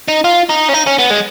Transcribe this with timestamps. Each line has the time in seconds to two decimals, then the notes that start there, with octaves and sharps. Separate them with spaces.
0.08 D#4
0.24 F4
0.50 D#4
0.69 C#4
0.74 D#4
0.87 C#4
0.99 B3
1.11 G#3